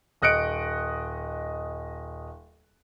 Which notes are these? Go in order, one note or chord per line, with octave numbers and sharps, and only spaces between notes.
D#1 D#5 F#6 C#7 D7